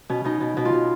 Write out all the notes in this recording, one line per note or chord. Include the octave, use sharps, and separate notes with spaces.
B2 C#4
B2 D#4
B2
B2
F4
B2